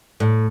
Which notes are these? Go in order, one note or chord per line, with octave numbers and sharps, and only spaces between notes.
A2